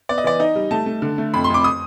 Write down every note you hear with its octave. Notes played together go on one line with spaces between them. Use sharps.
B3 D5
D#5
E3 D5
D#4 D#5
G3
A3 A5
A3
D3
A3
F2 B5
C6
F2 D6
D#6